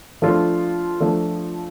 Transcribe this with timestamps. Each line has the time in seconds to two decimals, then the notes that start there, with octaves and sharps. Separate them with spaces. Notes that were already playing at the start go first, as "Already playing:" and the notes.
0.22 F3 A3 D4 F4
1.01 F3 A3 D4